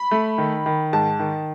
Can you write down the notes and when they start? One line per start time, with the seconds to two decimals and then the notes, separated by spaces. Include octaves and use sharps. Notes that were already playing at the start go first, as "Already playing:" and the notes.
Already playing: B5
0.11 A3
0.38 D#3
0.66 D#3
0.93 G#2 A5
1.20 D#3